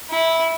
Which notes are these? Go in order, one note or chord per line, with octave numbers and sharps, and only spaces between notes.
E4